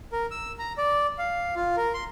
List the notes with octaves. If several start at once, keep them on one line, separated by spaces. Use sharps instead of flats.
A#4
E6
A#5
D5
F5
F4
A#4
C6